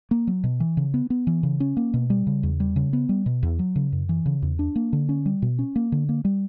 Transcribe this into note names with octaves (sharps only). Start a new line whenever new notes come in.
A#3
F#3
B2
E3
C#3
B3
B3
E3
C#3
C#4
A#3
B2
G3
C#3
E2
G3
C#3
B3
G3
B2
E2
F#3
C#3
F#2
E3
C#3
E2
D4
A#3
D3
C#4
G3
B2
C#4
A#3
D3
A#3
G3